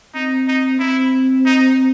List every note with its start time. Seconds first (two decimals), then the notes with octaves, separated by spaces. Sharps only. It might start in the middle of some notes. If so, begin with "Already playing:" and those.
0.14 C4 D#4
0.48 D#4
0.80 C4 E4
1.46 D#4